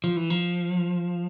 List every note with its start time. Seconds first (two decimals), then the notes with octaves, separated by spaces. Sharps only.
0.04 F3
0.16 E3
0.30 F3